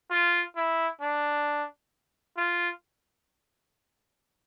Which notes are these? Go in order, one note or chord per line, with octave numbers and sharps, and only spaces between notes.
F4
E4
D4
F4